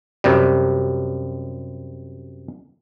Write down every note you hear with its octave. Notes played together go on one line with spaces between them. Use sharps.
F#2 C3 G3